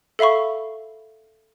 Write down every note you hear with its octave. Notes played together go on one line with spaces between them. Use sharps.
A4 E5 F5 B5 C#6